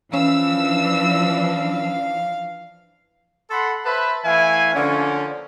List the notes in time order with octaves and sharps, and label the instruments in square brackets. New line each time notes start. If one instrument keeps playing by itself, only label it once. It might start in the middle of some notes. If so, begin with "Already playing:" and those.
[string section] E3 F3 D4 [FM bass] C#4 [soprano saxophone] F5 [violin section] E6
[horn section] A4 F#5 B5 C6
B4 C5 E5 A5 B5
E3 A3 E4 F5 G#5
D3 F3 A#3 C#4